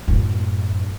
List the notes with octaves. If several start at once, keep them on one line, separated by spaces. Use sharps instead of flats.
F#2 A2